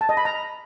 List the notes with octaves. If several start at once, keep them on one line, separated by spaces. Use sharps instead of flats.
A5
D#5
B5
A#5